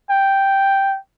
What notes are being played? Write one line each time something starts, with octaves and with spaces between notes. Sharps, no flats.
G5